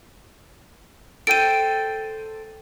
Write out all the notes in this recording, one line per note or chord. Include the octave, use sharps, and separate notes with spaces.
A4 C5 G5 D7 D#7